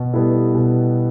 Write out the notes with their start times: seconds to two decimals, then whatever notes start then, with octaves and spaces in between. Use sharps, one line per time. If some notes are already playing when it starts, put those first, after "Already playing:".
Already playing: B2
0.13 G3 B3 E4 A4
0.55 B2